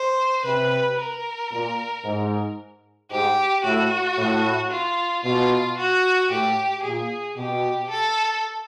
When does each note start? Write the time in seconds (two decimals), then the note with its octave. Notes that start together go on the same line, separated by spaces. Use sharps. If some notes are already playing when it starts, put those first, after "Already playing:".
Already playing: C5
0.45 C3 B4
0.99 A#4
1.52 A#2
2.05 G#2
3.11 G#2 G4
3.64 A2 F#4
4.18 A2
4.71 F4
5.24 B2 F4
5.77 F#4
6.31 A2 G4
6.83 A#2 G#4
7.37 B2 G4
7.90 A4